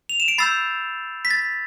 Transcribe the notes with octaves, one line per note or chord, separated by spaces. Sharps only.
F7
E7
D7
B5 E6 G6 A6 C7
B6
A6